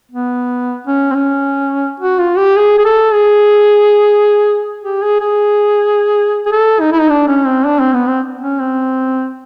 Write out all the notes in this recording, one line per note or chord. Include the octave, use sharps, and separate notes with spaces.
B3
C#4
C4
C#4
F#4
F4
G4
G#4
G#4
A4
G#4
G4
G#4
G#4
G#4
A4
D#4
E4
D#4
D4
C#4
C4
D4
C4
B3
C4
C#4
C4